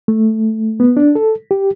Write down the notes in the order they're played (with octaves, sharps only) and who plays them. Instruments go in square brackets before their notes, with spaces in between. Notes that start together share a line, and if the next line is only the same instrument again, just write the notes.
[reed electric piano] A3
B3
D4
A4
G4